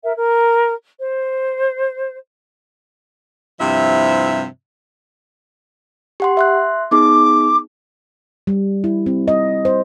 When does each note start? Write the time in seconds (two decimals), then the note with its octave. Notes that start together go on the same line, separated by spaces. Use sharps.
0.03 A#4 E5
0.16 A#4
0.99 C5
3.60 G2 C3 F3 E4 E5
6.20 G4 F#5 C6
6.37 E5 C6 F#6
6.91 B3 D#4 G#4 D6
8.47 G3
8.84 E4
9.06 C4
9.28 D#5
9.65 C5